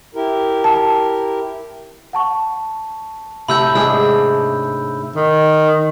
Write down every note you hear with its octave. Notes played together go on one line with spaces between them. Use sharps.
E4 G4 A#4
A5
F#5 A5 C#6
A2 C3 B5 E6 G6
G#2 D4 G#4 E6
D#3